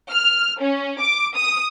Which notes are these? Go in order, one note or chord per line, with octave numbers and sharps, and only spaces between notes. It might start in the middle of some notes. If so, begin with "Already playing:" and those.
F6
C#4
D6
D#6